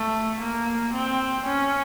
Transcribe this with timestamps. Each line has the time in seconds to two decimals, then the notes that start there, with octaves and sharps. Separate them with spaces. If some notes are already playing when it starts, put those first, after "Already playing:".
Already playing: A3
0.40 A#3
0.93 C4
1.46 C#4